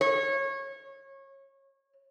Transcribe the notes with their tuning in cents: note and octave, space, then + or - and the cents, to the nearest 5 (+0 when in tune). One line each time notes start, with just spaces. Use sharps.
C#5 -25